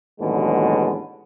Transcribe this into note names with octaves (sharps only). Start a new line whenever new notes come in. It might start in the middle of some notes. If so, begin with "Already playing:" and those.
A1 D#2 B2 D3 F#3 G#3